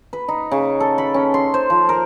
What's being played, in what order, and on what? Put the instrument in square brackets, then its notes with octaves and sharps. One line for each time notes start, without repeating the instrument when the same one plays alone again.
[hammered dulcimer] B4
D#4
C#3
A4
B5
C#4
C6
C5
F3
A#4